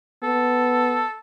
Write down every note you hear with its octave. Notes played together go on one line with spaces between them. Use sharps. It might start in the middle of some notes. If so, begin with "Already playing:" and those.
B3 A4